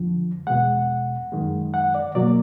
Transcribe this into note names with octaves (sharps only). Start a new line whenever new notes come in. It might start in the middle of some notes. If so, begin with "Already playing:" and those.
Already playing: F2 D3 F3
E2 B2 G#3 F#5
F#2 D#3 G#3
F#5
D5
B2 F#3 A#3 D5